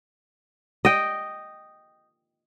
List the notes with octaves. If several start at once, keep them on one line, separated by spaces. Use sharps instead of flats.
D#5 G5